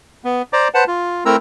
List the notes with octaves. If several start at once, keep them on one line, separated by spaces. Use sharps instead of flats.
B3
C5 D5 A#5 D6
B4 C5 F#5 A5
F4
A3 C4 E4 A#4 A#5 E6